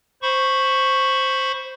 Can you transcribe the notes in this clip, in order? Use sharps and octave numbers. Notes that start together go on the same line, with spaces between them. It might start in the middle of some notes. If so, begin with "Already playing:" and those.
C5 B5 C#6